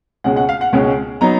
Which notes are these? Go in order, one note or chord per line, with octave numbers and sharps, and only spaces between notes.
C#2 B2 G#3 C#4 F#5
F#5
F5
F#5
C#2 B2 G#3 C#4
F#3 B3 D#4 A#5